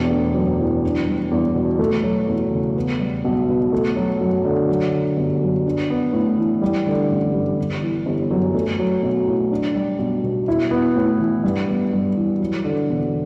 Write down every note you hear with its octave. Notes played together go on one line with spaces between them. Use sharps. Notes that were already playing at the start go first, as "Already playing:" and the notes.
Already playing: E1 E2 D4
A3
F#2
E3
D4
G3
E2
B2
A3
F#3
E2
C#3
B3
G3
B1
B2
A3
F#3
F#2
D3
F#3
D3
G1
F#2
D4
B3
A2
E3
G3
D3
A1
G2
G1
E3
G1
F#2
A3
F#3
B1
A2
D4
G3
B1
B2
E4
B3
A2
E3
G2
B3
G2
E3
F#3
D3
E1